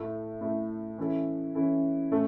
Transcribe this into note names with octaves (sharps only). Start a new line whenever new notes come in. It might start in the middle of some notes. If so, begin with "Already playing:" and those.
Already playing: A2 A3 E4 A4
A2 A3 E4 A4
E3 C#4 E4 A4
E3 C#4 E4 A4
A2 A3 C#4 A4